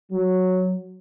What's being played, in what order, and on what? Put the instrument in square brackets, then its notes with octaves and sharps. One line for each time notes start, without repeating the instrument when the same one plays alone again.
[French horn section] F#3